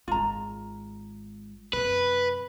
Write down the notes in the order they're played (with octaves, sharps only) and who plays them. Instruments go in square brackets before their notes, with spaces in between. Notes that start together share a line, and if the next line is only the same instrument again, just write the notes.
[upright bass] G#1 G#3 [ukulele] F4 A#5
[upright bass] F#2 C3 [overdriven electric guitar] B4